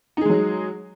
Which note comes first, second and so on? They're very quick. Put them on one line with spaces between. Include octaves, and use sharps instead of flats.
D#4 G#4 G#3 F#3